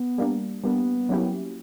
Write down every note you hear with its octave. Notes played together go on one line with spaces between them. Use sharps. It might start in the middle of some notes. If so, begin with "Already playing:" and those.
Already playing: B3
G3 A#3 D4
G3 A#3 B3 D4
F#3 A#3 C#4 E4 G4